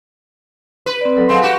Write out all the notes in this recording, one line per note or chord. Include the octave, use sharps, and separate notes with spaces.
B4
C4 D5
F#3 A4
G#3 C4 F5 F#5
F#4 G4